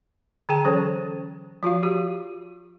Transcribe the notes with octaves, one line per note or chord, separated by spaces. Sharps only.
D3 G#4 G5 A5
E3 F#3 C#4 A4 C5 C#5
F3 F4 F#4 F5
F3 F#4 G4